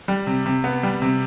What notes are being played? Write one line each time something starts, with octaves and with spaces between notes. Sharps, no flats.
G3
C3
C3
B3
G3
C3